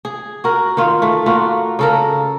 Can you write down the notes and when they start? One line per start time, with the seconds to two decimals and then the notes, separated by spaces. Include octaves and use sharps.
0.05 G#4
0.44 F#4 A#4
0.77 D#3 F4
1.02 A3
1.26 A3 A#3 F4 F#4
1.79 C#3 A4 A#4